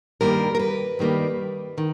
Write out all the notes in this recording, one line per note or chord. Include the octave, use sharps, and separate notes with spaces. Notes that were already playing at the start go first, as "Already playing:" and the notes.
G2 D#3 G3 A#3 A#4
A#4
B4
G2 D#3 G3 A#3
D#3